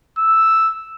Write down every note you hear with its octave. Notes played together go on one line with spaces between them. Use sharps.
E6